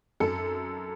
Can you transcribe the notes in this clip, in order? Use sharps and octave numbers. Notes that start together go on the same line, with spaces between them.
F#2 A4